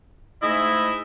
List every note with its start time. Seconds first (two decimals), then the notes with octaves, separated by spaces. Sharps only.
0.42 G#2 A3 E4 D#5